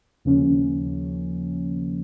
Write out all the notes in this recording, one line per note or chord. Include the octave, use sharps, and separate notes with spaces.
D#2 C#3 F3 A#3 C#4